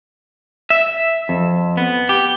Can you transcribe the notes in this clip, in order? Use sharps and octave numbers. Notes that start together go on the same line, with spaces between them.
E5
F2
B3
G4